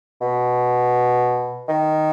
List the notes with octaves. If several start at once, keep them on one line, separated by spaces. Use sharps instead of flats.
B2
D#3